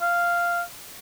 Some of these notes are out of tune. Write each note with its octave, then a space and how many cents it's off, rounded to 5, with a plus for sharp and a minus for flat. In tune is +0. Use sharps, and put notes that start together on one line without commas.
F5 -5